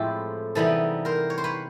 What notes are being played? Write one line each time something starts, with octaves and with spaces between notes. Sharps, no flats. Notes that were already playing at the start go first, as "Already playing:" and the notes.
Already playing: A2 F3 G#3 C4 E4 G4 A4
C3 E3 G3 B3 D#4 A4 B4
A#4 C5
C#5
C5
B4 C#5